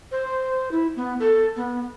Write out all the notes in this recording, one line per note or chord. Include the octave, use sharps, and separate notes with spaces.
C5
E4
B3
A4
B3